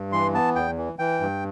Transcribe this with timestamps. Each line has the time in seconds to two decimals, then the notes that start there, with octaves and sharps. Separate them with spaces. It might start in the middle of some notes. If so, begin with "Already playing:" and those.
Already playing: G2
0.12 E3 C6
0.34 B3 A5
0.56 E2 G5
0.78 E3
0.99 E3 G5
1.21 G2